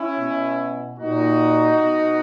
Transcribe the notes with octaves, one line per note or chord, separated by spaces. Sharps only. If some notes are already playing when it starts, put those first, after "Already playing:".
Already playing: C#4 E4
B2
A#2 D#4 F#4
B2